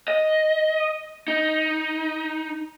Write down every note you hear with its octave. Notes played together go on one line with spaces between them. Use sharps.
D#5
D#4